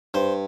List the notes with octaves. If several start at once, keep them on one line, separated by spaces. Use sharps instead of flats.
G2 C5